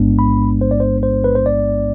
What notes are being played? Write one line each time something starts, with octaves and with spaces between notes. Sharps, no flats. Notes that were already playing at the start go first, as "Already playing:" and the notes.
Already playing: A1 G#2 G#3 B3 D4
B5
C5
D5
C5
C5
B4
C5
D5